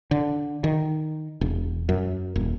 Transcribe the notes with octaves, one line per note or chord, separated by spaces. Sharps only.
D3
D#3
E1
F#2
D#1